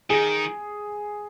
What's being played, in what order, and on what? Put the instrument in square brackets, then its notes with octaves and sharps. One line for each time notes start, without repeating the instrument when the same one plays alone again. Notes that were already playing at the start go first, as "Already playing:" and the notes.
[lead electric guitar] D#3 [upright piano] G#4